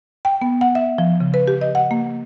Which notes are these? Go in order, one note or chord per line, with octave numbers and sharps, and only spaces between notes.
G5
B3
F#5
E5
F3
C#3
B4
G4
D#5
F#5
A#3